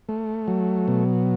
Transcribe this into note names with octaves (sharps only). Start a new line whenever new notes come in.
A3
F#3
B2